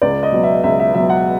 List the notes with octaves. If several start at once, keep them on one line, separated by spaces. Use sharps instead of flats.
C#2 D5
D#5
B2 F#3
E5
C#2 E5
E5
B2 F#3 E5
F#5